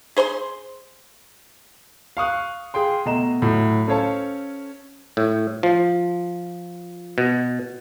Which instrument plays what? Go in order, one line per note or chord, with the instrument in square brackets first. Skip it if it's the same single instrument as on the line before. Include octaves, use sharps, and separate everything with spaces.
[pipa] G#4 C5 A#5 C6
[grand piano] F5 C#6 D#6 F#6
G#4 F5 G5 C6
B2 A3 D#5 A#5 E7
A2 F#3
C#4 A4 C5 C#5 F5 A5
[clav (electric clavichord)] A2
F3
B2